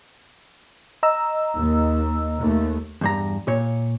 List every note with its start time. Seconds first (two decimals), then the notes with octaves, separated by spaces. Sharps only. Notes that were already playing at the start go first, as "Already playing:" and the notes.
1.03 D#5 A#5 E6
1.56 D#2
2.38 D#2 A3
3.01 E2 G2 A#5
3.48 A#2 C#5